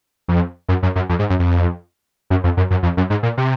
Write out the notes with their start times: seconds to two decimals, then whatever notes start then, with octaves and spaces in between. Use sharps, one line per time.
0.28 F2
0.68 F#2
0.83 F#2
0.96 F#2
1.09 F2
1.19 G#2
1.30 F#2
1.39 F2
2.30 F#2
2.44 F2
2.57 F#2
2.71 F#2
2.83 F2
2.97 F#2
3.10 G#2
3.23 A#2
3.37 C3